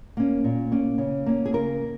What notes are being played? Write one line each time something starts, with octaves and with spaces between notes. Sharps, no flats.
A#3 C#4
A#2
A#3 C#4
C#3
A#3 C#4
G#4
C#3 A#4
A#3